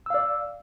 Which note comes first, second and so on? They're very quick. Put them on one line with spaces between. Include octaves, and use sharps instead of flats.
E6 F5 D5